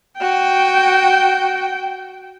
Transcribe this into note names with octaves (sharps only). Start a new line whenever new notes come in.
F#4 G5